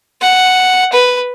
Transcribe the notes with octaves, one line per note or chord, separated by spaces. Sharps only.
F#5
B4